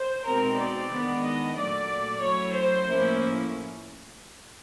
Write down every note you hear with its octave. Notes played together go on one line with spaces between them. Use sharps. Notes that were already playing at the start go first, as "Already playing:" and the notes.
Already playing: C5
B2 G#3 C4 D#4 A#4
D5
D#3 G#3 B3 D4
D#5
A#2 F#3 A3 D5
F#3 A3 C#4 E4 C#5
C5
A2 F3 A#3 C#4 E4